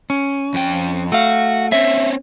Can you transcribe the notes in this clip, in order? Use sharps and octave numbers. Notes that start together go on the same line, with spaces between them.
C#4
F2 G5
A3 F#4 F5
C4 C#4 E5